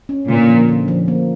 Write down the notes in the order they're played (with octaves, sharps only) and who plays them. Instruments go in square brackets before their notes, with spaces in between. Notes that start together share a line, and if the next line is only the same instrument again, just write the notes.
[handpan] C#4
[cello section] A#2 [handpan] D3
[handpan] F3
D3
F3
A#3